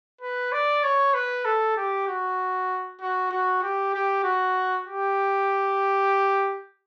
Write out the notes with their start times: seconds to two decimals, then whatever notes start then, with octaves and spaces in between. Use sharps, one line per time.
0.21 B4
0.52 D5
0.83 C#5
1.14 B4
1.45 A4
1.76 G4
2.07 F#4
3.00 F#4
3.31 F#4
3.62 G4
3.94 G4
4.23 F#4
4.86 G4